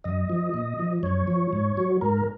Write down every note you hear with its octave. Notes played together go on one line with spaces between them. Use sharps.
F#2 D#5
F3
A#2
F3
F#2 C#5
F3
G#2
F#3
G#2 A#4